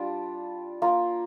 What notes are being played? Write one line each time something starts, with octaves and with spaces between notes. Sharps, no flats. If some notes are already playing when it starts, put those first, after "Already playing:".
Already playing: G3 D4 F4
A#3 F4